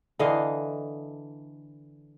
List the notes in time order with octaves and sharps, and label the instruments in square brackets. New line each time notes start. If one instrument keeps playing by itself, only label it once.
[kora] D3 E3 D#5 F5